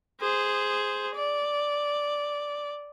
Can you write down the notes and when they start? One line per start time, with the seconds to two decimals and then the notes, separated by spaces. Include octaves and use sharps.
0.21 G#4 C5
1.15 D5